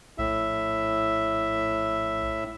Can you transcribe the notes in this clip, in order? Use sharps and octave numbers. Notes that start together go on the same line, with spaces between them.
A#1 A2 E5